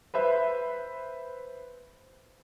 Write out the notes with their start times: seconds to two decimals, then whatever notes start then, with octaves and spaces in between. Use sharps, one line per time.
0.14 B4 C5 E5